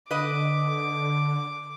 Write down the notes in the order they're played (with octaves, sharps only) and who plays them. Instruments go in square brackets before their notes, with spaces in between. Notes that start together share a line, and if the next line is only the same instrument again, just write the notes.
[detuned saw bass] D3 [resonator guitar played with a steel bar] B4 D#5 [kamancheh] D6